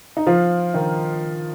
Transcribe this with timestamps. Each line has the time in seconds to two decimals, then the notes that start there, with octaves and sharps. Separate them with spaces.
0.17 D#4
0.27 F3 F4
0.74 D#3 D#4